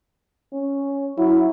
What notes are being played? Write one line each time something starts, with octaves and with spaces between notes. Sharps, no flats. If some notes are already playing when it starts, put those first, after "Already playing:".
C#4
F#3 E4